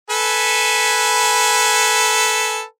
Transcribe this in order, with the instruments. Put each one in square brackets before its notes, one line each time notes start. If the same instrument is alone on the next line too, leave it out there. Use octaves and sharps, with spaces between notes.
[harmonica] A4 B4 G#5